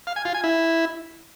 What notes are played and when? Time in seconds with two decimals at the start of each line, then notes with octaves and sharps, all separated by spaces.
0.07 F5
0.16 G#5
0.25 F4
0.34 G#5
0.44 E4